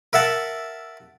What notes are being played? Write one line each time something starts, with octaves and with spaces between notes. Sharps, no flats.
A#4 E5 F#5 A5